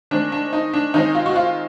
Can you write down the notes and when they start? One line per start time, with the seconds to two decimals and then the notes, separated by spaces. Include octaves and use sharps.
0.11 D#3 G#3 C4 D4
0.32 D4
0.53 D#4
0.74 D4
0.94 D#3 G#3 C4 D#4
1.15 F4
1.26 F#4
1.36 F4